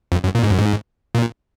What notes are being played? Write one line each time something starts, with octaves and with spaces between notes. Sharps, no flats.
F2
F#2
A#2
G#2
F#2
G#2
A#2